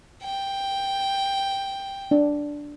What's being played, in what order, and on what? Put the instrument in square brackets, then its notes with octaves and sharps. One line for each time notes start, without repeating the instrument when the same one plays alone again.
[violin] G5
[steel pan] D4